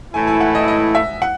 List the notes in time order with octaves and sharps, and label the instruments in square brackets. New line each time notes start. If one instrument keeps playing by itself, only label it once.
[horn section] A2 E3 A3 E4 [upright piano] G#5
[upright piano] G#5
F#5
D#5
D#5
E5
F#5